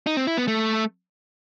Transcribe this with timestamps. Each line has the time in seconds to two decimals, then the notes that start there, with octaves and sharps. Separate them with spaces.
0.07 D#4
0.17 C4
0.27 E4
0.37 B3
0.48 A3